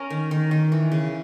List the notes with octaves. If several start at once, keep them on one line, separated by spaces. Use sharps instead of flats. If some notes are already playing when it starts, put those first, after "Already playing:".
Already playing: C#4 A#4
D#3
D#3
D#3
E3
C#3